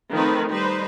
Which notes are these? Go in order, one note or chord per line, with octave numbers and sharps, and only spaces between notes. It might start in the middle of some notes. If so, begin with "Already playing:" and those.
D#3 F3 A3 C4 D#4 B4
G3 D#4 B4 C5